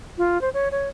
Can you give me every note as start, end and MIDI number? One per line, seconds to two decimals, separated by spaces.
0.18 0.40 65
0.41 0.49 72
0.54 0.68 73
0.72 0.89 73